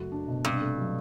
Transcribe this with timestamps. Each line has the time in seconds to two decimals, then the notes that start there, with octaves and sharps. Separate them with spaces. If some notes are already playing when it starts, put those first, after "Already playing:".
Already playing: F#1 A3 F#4
0.12 D4
0.28 B2
0.44 G2 C3
0.62 A3
0.78 F#3